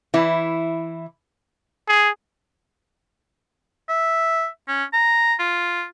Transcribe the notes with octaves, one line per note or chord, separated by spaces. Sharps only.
E3 E4
G#4
E5
C#4
A#5
F4